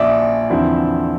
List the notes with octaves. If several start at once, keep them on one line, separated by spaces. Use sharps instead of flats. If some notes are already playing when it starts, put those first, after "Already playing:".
Already playing: A#1 A#2 F3 D5 E5
E2 D3 F3 C4 E4